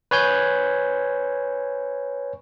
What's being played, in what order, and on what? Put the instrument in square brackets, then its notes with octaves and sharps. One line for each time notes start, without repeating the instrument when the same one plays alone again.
[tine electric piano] B4 C#5 G#5 G6